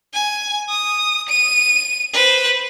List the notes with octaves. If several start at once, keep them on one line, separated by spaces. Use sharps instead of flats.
G#5
D#6
D#7
B4 C5